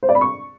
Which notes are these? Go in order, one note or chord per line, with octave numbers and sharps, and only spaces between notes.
C5
D5
B5
C#6